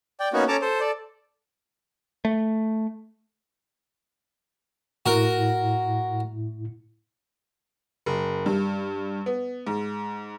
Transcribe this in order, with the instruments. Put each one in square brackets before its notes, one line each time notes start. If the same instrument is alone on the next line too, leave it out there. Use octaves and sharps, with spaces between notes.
[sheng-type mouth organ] D5 G5
A#3 B3 C#4 D#4 F#4
C#4 A4 A5 A#5 D6
A4 C5
A4 D5
[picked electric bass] A3
[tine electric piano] A2 E4 [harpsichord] F#4 A#4
[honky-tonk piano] F#1
G2
B3
G#2